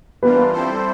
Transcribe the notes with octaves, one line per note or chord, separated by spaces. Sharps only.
E3 G3 A#3 B3 D4 F4 B4
G3 C4 E4 A4 C5